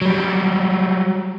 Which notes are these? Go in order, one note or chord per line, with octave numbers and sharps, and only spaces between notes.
F#3 G3